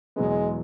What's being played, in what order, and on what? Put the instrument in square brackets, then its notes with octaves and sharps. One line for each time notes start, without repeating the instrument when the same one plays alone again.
[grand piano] E2 B2 F#3 B3 [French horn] G#3